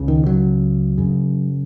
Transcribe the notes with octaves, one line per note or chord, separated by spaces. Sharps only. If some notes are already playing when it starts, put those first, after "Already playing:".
Already playing: C#2 C#3
D#3
F#3
F#2 C#3